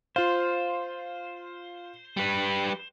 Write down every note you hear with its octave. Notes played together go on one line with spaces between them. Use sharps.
F4 C5 F5
G3 B4